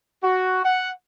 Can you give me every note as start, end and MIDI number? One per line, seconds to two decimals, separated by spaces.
0.23 0.63 66
0.64 0.90 78